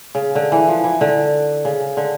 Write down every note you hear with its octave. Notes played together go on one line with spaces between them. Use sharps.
C#3
D3
E3
F3
E3
D3
C#3
D3